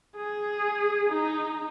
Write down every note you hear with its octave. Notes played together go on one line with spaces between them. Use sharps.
G#4
D#4